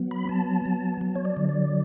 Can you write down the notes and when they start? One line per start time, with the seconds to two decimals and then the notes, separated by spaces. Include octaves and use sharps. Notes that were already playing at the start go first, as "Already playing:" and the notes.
Already playing: F#3 B3
0.11 B5
0.29 B3 A5
0.65 F#3
1.01 F#3
1.15 C#5
1.25 D5
1.37 D3
1.49 D5